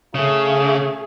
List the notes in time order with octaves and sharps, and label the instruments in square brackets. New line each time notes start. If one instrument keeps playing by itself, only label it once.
[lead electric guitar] C#3 [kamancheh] A3 G#4